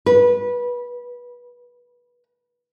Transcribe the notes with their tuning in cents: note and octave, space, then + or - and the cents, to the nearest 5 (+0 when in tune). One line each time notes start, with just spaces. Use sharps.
B4 -25